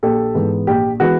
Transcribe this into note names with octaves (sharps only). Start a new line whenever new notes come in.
A#1 G4 A4
G#2 E3 G#3 B3
A#1 G4
E3 G#3 B3 F#4